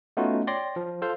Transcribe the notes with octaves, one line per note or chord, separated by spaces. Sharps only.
A3 B3 C#4 D#4 F4 F#4
C#5 D5 G5 C6 A#6
F3
F4 A4 C5 F5